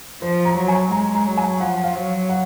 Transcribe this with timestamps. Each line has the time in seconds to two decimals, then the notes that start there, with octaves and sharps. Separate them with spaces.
0.22 F3 C5
0.45 A#5
0.57 F#3
0.68 G#5
0.91 G#3 A#5
1.14 A#5
1.26 F#3
1.37 G#5
1.60 F3 F#5
1.84 F5
1.95 F#3
2.29 F#5